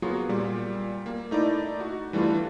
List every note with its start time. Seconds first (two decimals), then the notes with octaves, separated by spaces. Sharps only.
0.02 F#3 A#3 B3 F4 F#4 G#4
0.29 A#2 G3
1.06 A#3
1.31 A3 D#4 E4 D5
1.80 F#4
2.13 E3 G3 A3 D4 F4